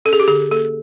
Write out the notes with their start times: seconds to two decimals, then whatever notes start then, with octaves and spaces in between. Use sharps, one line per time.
0.05 C#4 A4
0.13 G#4
0.20 G4
0.28 D3 G#4
0.51 A#3 A4